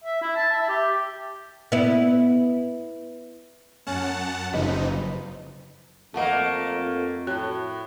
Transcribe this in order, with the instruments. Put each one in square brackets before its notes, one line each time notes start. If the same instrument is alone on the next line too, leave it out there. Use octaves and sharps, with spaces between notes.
[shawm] E5
E4
A5
E5
G4
[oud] B3 E4
[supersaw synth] F#2 F#5 A5 [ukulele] C#4
[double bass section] F#1 [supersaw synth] C3 F3 D#4 [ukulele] B4 D#5
[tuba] F2 [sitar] A3 A#3 [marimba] D#5 F#5 A5
[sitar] A2 [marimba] F#4